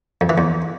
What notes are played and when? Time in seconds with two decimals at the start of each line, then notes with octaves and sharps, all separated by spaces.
0.21 F2
0.29 E3
0.38 E2